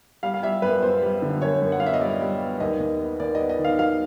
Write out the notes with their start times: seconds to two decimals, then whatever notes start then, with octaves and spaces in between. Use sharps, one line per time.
0.23 G3 F5
0.34 F5
0.43 G3 E5
0.62 F#2 B4
0.82 B3 C5
1.02 G3
1.22 D3
1.42 F#2 C#5
1.62 F#2
1.72 F#5
1.80 F#2 F5
1.86 E5
1.94 D#5
2.01 G3 D5
2.21 G3
2.40 B3
2.60 D#2 D#5
2.80 D#2
2.99 B3
3.20 D#2 D5
3.35 D#5
3.39 B3
3.49 D#5
3.59 D#3
3.64 F5
3.79 F#3 F5